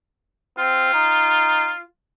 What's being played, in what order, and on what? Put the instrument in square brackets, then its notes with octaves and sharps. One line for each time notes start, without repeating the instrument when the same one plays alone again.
[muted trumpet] C4 [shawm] F4
[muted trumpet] D#4